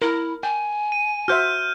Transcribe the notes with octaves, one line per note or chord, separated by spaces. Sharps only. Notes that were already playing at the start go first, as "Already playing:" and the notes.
E4 A#4
G5 G#5
D#7
F#4 C5 E5 F6 G6